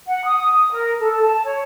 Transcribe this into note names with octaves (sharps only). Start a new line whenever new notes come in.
F#5
D#6
A#4
A4
A5
C#5